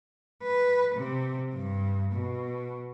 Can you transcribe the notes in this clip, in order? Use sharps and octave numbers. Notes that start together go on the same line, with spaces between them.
B4
C3
G2
B2